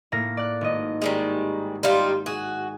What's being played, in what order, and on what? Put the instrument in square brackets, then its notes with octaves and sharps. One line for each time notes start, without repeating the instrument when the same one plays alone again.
[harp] A2 A#3 A#6
D5 F#6
G#1 D#5
[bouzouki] D#3 G3 G#3
G3 D#4 F4
[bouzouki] F#4 [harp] G#4